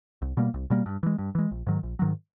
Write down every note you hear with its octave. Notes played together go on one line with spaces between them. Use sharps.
C2
B2 G3 A#3
C2
B2 G3 A#3
G2
E3 G#3
G2
E3 G#3
A#1
G#2 D#3 F#3
A#1
G#2 D#3 F#3